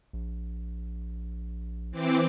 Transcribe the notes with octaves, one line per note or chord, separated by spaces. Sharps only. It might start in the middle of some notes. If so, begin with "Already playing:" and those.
A#1
E3 C4 D6